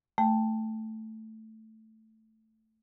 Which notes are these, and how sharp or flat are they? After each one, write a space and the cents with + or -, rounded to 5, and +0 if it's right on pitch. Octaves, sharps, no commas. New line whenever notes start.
A3 +0 G5 +15